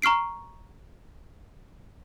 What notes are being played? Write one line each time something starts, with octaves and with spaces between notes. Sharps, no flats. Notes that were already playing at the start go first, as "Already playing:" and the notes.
A#5 C#6 F6 C7 D7